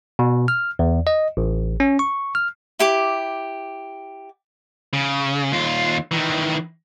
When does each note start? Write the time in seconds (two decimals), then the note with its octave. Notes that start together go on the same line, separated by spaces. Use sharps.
0.19 B2
0.48 F6
0.79 E2
1.07 D#5
1.37 A1
1.80 C#4
1.99 C#6
2.35 F6
2.79 E4 G4 D6
4.93 C#3
5.52 D#2 F4
6.11 D#3 E3